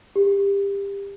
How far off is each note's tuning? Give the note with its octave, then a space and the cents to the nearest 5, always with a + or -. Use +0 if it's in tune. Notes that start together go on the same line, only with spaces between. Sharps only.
G4 +25